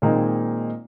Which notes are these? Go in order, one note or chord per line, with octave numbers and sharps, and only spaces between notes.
A#2 D#3 G#3 A#3 C4 D#4